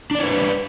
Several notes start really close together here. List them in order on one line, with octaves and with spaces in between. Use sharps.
D4 D5 C#5 B4